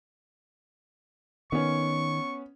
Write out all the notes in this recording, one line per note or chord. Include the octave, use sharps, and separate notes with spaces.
D#3 B3 C#4 C#6